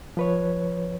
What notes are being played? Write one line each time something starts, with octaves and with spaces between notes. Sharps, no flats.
F3 B4 C#5